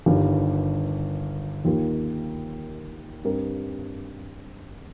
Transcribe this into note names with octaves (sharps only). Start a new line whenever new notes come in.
G1 G2 D#3
D#2 D#3 A#3 F4
G2 G3 C4 G4 A#4